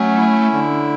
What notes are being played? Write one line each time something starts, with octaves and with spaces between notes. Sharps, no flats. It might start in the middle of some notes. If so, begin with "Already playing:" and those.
Already playing: F#3 A3 C#4
E4
D3